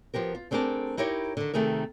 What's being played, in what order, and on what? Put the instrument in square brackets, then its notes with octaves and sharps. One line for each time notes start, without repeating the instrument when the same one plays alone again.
[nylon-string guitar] F3 B3 G4 A#4
F4
A3 C4 D4 G#4 A#4 A5
D#4 E4 G4 A#4 C#5
D3 D#3
C3 D#3 A3 G#4 A#4